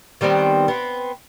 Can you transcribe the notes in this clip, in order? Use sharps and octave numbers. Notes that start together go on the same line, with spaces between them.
D#3 G3 B3 C4
B3 C4